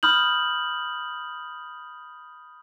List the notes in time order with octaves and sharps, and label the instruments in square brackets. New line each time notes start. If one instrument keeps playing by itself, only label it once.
[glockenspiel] B5 D#6 F6 G6 F#7